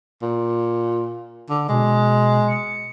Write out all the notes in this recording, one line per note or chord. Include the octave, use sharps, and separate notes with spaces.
A#2
D3
B2 G#3
C#7